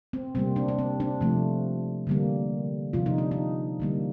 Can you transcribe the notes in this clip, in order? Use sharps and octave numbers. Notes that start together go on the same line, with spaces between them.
C4
C3 G3 A#3 C4
D4
D4
C4
D4
C3 F3 A3
D3 G3 A#3
C3 F3 A#3 F4
D#4
D4
D#4
D3 G3 A#3